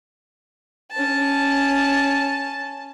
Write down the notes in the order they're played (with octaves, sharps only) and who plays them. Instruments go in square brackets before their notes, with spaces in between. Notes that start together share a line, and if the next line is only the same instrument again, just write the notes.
[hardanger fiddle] C#4 A5